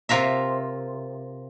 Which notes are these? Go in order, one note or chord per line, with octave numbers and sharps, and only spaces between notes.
C3 F4 A#4 E5